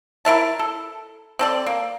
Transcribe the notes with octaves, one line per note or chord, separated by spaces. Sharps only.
E4 A#4 E5 A5
A4
C4 A4 D5
A#3